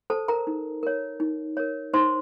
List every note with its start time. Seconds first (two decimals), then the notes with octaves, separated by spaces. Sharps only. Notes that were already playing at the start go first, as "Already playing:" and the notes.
0.10 A4 C5 A5
0.28 A#4 A#5
0.47 D#4
0.83 A#4 C#5
1.20 D#4
1.57 A#4 C#5
1.94 D#4 C5 C6